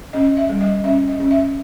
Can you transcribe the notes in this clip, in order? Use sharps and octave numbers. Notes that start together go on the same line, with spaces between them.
C#4 D#5
E5
G3
D#5
C#4 E5
D#5
C#4
E5